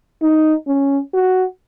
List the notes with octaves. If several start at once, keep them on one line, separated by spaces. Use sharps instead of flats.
D#4
C#4
F#4